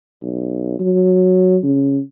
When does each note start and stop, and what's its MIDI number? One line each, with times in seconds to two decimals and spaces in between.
0.22 0.78 35
0.79 1.58 54
1.63 2.00 49